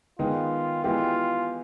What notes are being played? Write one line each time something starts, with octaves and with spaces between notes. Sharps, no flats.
D#3 G#3 B3 F4
E3 G#3 B3 E4 F4 G4